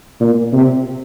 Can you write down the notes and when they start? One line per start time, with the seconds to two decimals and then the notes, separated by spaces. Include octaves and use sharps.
0.20 A#2
0.53 C3